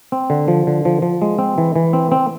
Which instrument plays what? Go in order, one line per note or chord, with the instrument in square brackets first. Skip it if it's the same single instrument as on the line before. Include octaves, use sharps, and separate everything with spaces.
[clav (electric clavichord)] C4
D3
F3
D3
F3
F3
G#3
C4
E3
E3
C4
C4